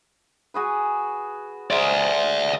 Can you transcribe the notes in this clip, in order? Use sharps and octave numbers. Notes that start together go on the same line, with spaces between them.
F#4 G#4 B4
G#3 A#4 C5 D5 E5